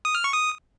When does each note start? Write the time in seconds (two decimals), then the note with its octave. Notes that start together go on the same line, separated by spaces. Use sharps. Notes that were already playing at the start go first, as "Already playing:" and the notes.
0.05 D#6
0.15 F6
0.24 C#6
0.34 D#6